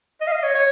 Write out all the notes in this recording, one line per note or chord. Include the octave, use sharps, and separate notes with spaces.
D#5
F5
D#5
C#5
C#5